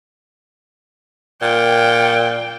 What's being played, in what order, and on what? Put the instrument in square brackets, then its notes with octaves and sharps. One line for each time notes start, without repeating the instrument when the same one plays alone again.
[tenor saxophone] A#2 [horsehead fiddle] G5